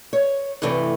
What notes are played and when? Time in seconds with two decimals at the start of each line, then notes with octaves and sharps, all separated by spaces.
0.13 C#5
0.62 G2 C3 E3 A3